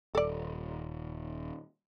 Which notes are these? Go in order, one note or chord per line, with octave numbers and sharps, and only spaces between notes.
D#1 A4 D5